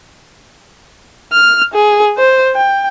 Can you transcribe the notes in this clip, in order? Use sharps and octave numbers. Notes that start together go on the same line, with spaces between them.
F6
G#4
C5
G5